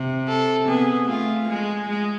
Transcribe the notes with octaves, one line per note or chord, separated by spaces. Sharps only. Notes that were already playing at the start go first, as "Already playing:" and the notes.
Already playing: C3
A4
B3 G#4
A3 F4
G#3 G#4
G#3